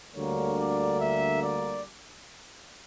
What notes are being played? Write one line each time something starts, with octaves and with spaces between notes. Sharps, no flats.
D2 D3 G3 A#3 C#5
D5
E5
D5